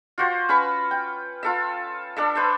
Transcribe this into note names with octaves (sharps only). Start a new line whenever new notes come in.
F4 F#4 C5
C#4 B4 B5 C#6
G5
F4 A4 E5
D4 A4 E5
B4 C5 E5